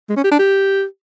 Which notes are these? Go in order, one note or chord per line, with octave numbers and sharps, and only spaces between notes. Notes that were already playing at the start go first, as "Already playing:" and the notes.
G#3
C#4
G4
D4
G4